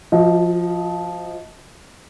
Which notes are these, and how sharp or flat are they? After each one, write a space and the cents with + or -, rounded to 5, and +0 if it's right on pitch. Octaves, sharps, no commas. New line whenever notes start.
F3 +0 F#4 -35 D#5 +25